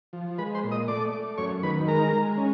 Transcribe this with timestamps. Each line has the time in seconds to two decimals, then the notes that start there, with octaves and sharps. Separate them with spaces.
0.13 F3
0.38 G#3 B4 B5
0.55 C5 C6
0.63 A#2
0.71 D#5 D#6
0.88 A3 D5 D6
1.13 A3
1.38 F#2 C#5 C#6
1.63 D#3 B4 B5
1.88 G#3 A#4 A#5
2.13 G#3
2.37 C#4